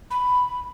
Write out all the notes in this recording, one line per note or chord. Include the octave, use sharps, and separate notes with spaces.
B5